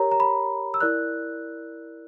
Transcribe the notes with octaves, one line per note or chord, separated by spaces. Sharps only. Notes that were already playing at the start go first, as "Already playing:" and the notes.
Already playing: G4 A#4 C#5 A#5
A#5
B5
E6
E4 A#4 D5 F#6